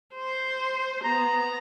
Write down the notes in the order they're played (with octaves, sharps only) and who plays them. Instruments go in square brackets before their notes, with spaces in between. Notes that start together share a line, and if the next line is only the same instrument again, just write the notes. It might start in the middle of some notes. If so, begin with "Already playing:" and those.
[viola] C5
[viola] B3 [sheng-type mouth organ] A#5